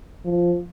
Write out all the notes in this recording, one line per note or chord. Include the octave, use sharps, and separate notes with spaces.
F3